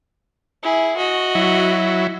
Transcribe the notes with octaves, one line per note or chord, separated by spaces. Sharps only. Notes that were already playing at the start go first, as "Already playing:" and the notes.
E4 G#4
F#4 D#5
F#3 E4